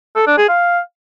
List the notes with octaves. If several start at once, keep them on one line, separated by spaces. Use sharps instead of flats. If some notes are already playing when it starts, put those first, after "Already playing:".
A4
D4
G#4
F5